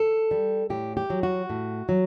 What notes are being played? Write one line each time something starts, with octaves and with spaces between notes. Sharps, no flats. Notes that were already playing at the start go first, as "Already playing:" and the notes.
Already playing: A4
G3
A2 G4
G4
F#3
F#4
A2
F#3